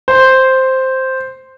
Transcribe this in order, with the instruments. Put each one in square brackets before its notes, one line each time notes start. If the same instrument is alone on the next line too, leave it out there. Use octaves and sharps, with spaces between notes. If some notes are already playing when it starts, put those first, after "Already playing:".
[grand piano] C5